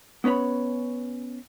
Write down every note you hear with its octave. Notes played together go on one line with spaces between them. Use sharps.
B3 C#4 B4 C#5 B5